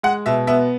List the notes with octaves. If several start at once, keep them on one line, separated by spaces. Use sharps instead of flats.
G#3 F#5
B2 E5
B3 E5